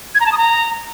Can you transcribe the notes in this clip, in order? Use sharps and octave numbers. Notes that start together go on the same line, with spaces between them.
G#6
A#5
A5
D#6
A#5